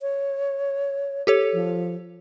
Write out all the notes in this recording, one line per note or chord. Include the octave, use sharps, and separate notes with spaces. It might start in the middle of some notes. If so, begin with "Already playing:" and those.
C#5
G4 A4 C#5
F3